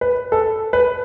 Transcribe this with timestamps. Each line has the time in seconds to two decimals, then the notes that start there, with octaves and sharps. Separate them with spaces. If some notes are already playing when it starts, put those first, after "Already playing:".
0.01 B4
0.32 A4
0.73 B4